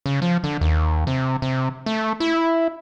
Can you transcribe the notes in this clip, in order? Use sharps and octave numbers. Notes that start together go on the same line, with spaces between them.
C#3
F3
D3
D#2
C3
C3
A3
E4